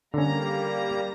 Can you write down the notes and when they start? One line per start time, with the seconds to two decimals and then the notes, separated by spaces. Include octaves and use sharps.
0.14 D3 G3 A#3 C#4 A#5